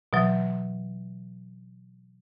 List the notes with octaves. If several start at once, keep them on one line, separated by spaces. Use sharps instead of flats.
B2 E3 F#3